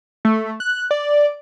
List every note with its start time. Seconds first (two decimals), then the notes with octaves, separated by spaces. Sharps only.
0.25 A3
0.60 F#6
0.91 D5